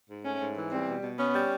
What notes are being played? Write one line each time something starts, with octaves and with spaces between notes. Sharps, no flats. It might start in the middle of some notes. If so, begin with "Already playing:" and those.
G#2
A3 C#4
G#2
E3
G3 C4
B2
B2
B3 C#4
G3